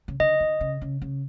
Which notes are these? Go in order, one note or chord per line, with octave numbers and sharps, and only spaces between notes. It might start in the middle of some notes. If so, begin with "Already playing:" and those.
C#3
D3 D#5
D3
C#3
C#3
C#3